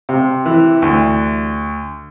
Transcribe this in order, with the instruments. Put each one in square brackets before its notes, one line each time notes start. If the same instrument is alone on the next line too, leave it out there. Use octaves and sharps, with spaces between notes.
[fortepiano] C3
E3
D2